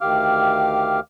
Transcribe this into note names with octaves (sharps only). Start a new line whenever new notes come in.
D2 D#3 G4 F5 D6 F6